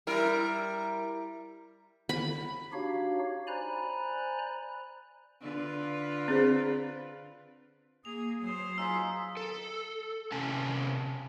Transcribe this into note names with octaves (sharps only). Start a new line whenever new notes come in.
G3 E4 A#4
B5
D4 D#4 F#4 G4 C#5 F5
C5 D5 G#5 A#5 B5 F#6
D3 F4 B4
C4 G#4 C5
A#3 G#4 D#6 F7
F#3 C5 D#6
D#4 F4 G#4 E6 B6
A4
C3 C#4 G#5 A5